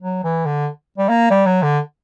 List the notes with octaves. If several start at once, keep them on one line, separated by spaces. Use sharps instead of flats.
F#3
E3
D3
G3
A#3
G3
F#3
D3